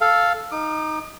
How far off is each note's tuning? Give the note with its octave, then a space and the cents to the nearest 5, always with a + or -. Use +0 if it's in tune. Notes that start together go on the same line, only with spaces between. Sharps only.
A4 +0 F5 +0
D#4 +0 D6 +40